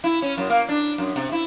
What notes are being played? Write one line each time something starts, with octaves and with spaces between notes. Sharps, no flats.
E4
C#4
F#2
A#3
D4
F#2
C3
E4